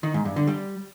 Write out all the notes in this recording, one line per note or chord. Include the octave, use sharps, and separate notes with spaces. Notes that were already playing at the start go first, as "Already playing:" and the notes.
D#3
G#2
G2
D3
G3